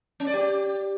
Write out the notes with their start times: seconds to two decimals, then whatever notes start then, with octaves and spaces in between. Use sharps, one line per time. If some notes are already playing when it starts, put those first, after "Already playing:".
0.20 C#4
0.27 D5
0.34 G4